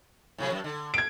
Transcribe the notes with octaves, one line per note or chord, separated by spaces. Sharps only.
A2 C3 F#3
F#2
D3
G#6 D7